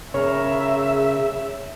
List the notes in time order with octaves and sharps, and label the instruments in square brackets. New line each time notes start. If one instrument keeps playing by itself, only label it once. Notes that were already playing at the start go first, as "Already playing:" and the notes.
[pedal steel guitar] C#3 A#4 A#5 [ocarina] G#4 [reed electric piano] C#5 [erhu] E5